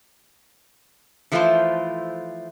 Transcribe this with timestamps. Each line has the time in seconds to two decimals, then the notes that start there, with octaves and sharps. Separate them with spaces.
1.32 E3 F3 A3 E4 F4 C5